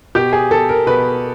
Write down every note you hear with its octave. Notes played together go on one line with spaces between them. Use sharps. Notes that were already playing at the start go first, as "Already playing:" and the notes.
B2 G4
G#4
A4
A#4
B2 B4